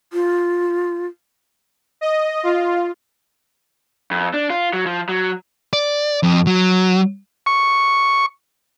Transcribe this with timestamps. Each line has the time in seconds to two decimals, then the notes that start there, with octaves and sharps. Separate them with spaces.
0.13 F4
2.01 D#5
2.43 F4
4.11 F2
4.34 D4
4.50 F4
4.73 F#3
4.86 F3
5.09 F#3
5.73 D5
6.23 F2
6.47 F#3
7.46 C#6